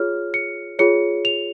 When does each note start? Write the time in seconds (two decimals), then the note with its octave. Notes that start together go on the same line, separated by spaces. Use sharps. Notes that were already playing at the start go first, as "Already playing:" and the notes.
Already playing: F4 G#4 C#5 F6
0.34 C#7
0.79 F4 G#4 C#5 C#7
1.25 F7